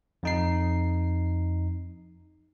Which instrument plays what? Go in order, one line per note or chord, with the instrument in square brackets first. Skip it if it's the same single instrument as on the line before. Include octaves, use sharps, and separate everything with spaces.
[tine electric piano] F2 D#4 C7